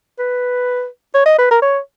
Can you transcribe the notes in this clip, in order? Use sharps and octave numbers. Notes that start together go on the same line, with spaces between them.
B4
C#5
D#5
B4
A#4
C#5